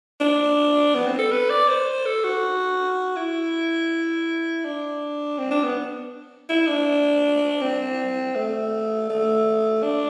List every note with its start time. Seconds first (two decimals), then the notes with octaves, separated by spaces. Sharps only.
0.20 D4
0.95 B3
1.06 C4
1.18 A4
1.31 B4
1.50 D5
1.68 C5
2.06 A4
2.24 F#4
3.16 E4
4.65 D4
5.38 C4
5.51 D4
5.63 B3
6.49 E4
6.68 D4
7.61 C4
8.35 A3
9.10 A3
9.83 D4